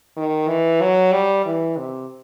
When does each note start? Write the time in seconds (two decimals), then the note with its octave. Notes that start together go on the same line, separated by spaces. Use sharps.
0.17 D#3
0.48 E3
0.81 F#3
1.12 G3
1.45 E3
1.77 C3